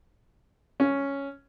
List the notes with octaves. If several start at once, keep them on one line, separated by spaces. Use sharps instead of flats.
C#4